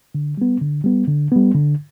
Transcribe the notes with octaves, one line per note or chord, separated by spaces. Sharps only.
D3
G3 B3
D3
G3 B3
D3
G3 B3
D3